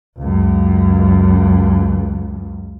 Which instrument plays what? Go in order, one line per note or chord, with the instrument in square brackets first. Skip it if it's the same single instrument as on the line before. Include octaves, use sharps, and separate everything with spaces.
[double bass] C#2 F#2